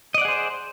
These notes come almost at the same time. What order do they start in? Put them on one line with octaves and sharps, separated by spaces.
D#5 D5 F#5 G#4 C5